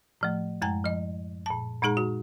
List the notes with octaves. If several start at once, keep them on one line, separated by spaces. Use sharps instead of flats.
A2 F3 A3
F#2 G#3 G#5 A#5
F3 D#5
A#2 A5
A#2 G#3 D#4 G#4 A#5
F#4